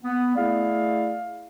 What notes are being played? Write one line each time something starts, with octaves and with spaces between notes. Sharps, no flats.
B3
A3 E4 G#4 D5 F5